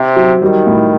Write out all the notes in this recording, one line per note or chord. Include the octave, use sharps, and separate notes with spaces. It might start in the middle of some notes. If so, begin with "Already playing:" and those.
Already playing: C3 C4
F#3
D#3 G3
A2